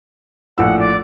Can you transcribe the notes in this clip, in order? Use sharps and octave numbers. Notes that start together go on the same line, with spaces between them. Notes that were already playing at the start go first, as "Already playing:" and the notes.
A#1 A2 F#5 E6
D5